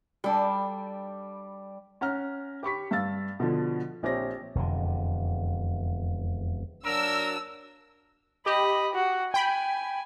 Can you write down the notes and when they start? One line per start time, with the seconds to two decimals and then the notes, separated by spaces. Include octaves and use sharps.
0.24 G3 D4 A4
2.01 C#4 F#5 A#5 F6
2.63 G4 B5 C#6 B6
2.91 G2 F5 E6 A6
3.40 B2 D3 F3
4.03 A#1 C4 G4 C#5 A#6
4.55 E1 F2 D3
6.85 F#3 A#3 D4 A#4 E6
8.46 G4 D#5 B5
8.95 F#4
9.34 G5 G#5 B5